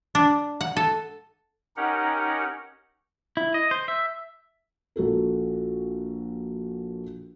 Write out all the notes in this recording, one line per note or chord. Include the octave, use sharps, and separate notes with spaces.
D4
F#5
A4
C#4 D#4 G4 A#4 F#5
E4
D#5
C5
E5
A#1 F#4 A4 A#4